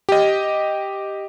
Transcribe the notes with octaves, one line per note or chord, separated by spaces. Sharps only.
G4 D#5